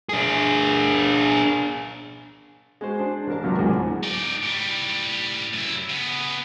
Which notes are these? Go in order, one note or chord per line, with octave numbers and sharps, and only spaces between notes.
D4 G#4
G#3 F#4 C5
D4 C5
A1 D4 A#4 A5
C#2 F#3 C4 F4 D6
D2 G#2 E3 F#3 G#3
D#4 D5
A2 G3
F#2 E4
C#3 B3